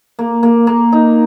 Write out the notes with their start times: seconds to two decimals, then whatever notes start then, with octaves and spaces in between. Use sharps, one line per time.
0.19 A#3
0.43 A#3
0.67 A#3
0.92 D#4